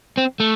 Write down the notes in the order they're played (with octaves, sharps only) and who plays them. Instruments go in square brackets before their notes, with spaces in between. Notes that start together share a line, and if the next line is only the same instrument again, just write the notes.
[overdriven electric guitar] C4
A3